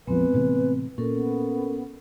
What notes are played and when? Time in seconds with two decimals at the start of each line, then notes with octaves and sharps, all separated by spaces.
0.07 A#1 F2 F3 G#3 B3 C4 B4
0.34 A2 C3 E3
0.98 A#2 C#4 A4 A#4
1.12 B3